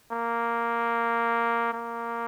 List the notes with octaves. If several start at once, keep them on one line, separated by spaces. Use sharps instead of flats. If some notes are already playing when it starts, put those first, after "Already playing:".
A#3
A#3